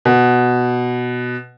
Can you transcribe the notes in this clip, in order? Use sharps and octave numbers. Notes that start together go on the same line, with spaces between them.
B2